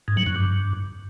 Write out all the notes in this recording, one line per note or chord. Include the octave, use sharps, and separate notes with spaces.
G#2
F#3
F#2
G2